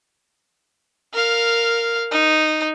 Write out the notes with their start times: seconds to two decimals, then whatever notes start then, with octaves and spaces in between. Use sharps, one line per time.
1.13 A#4 F5
2.11 D#4